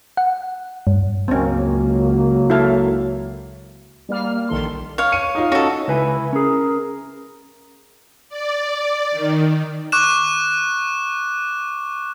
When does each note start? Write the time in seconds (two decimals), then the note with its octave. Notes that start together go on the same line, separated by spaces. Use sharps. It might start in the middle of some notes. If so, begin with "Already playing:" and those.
0.17 F#5
0.87 G2
1.28 C#2 F#3 A#3 C4 C#4
2.50 E4 A4 F5
4.09 G3 A#3 F6
4.49 A#1 D#3 A4 C6
4.98 C#5 F5
5.12 C#7 D#7
5.35 D#4 F4
5.52 C#4 D#4 F#4 A4
5.88 C#2 E4 B4 G#5
6.33 C#4 G#4 A#4
8.29 D5
9.12 D#3
9.92 C#6 D6 F#6 E7